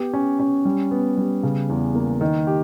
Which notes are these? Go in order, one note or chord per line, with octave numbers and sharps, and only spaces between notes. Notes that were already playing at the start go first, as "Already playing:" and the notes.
Already playing: B3 G4
C#4
C#4
G3
B3
G3
C#3
E2
A#3
D#3
G4